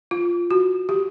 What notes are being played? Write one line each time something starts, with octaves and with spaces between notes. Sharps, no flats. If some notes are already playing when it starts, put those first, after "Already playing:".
F4
F#4
G4